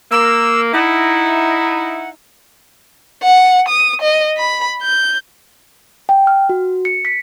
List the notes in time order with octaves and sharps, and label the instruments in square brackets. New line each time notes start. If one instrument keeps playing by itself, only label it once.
[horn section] A#3 [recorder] E6
[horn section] D#4 E4 [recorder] F#5
[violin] F#5
D#6
D#5
B5
G6
[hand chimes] G5
F6
F#4
C#7
B6